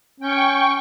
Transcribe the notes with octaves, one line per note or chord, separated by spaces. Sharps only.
C#4 G5 C#6